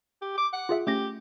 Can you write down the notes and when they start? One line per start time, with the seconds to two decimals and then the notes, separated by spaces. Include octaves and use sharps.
0.21 G4
0.37 D6
0.53 F#5
0.69 F4 G#4 E5
0.87 A3 C#4 G4 A#6